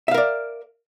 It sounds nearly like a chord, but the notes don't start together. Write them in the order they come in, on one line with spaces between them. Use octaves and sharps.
E5 F5 A#4 D5